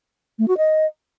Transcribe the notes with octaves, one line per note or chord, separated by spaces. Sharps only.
A3
F#4
D#5